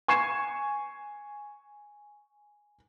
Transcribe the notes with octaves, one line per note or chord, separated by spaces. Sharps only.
G#5 C#6 G#6 C7 E7